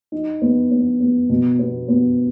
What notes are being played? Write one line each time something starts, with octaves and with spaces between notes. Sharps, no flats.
D#4
B3
B3
B3
B2
B3
B3